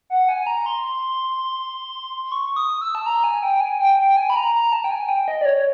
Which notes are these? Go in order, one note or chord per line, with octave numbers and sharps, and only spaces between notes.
F#5
G#5
A#5
C6
C6
C#6
D#6
E6
A5
A#5
G#5
G5
G#5
G5
G5
G#5
B5
A#5
A#5
A5
G5
G#5
G5
D#5
D5
C#5
C#5